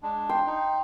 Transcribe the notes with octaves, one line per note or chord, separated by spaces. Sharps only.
G#3 D4
G5 C6
D#4